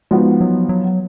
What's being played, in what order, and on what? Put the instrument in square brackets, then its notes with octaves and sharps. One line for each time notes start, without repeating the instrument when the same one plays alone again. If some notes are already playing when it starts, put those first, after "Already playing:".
[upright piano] F3 B3 D#4 F#4 [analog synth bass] G#3
[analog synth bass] F#3
F#3